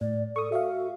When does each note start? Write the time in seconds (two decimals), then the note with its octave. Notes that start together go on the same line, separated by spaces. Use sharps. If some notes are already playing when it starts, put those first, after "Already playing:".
0.01 A2 D5
0.36 A4 C#6 D#6
0.52 F#4 E5 F5